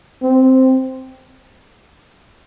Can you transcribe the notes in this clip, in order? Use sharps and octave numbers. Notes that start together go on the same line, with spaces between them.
C4